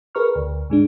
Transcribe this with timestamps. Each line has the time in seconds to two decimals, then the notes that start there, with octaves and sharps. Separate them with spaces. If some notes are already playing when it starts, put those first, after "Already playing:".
0.15 G#4 A#4 B4 A#5 C#6 F6
0.35 D2
0.70 G#2 G#3 D4